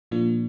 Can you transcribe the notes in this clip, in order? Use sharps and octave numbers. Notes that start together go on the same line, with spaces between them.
A#2 F3 A#3 D4 F4